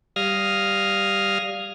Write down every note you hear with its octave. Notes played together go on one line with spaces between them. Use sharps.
G3 F5 D#6 F6 G#6 A#6